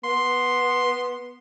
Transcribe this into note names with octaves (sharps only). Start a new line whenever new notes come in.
B3 C6